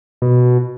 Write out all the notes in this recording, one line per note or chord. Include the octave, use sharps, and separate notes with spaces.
B2